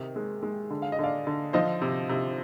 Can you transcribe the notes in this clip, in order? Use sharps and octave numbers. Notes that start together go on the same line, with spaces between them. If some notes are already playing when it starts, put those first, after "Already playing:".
Already playing: C3 D#3
G#3
G#3
D3
F5
D#5
D3 D5 F5
D3
F3 C5 D#5
C3
C3